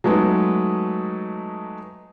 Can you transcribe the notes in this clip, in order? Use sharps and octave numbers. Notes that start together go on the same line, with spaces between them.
F#3 G#3 A3 B3 D#4